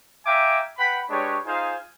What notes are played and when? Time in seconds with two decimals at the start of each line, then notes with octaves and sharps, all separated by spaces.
0.25 E5 F5 G5 G#5 A#5 D6
0.78 B4 F#5 G5 B5
1.09 G#3 D4 G4 B4 C#5
1.46 D#4 F4 G#4 C5 F5 G#5